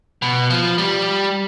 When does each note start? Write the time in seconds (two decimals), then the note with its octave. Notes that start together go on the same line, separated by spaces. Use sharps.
0.22 B2
0.50 F3
0.78 G3